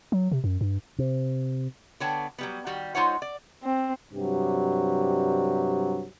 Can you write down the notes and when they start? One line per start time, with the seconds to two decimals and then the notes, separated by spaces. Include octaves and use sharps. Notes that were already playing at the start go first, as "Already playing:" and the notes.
0.12 F#3
0.32 C3
0.44 F#2
0.61 G2
0.98 C3
2.00 D3 B3 D4 C#5 G5 A5
2.38 F#3 G3 B3
2.66 D#3 G3 F#4 G4
2.95 G#3 D#4 F4 C5 C#5 F#5
3.22 D5
3.63 C4
4.14 G2 C3 F#3 G3 G4